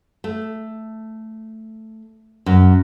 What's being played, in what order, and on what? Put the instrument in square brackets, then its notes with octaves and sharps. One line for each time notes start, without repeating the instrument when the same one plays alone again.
[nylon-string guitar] A3
F#2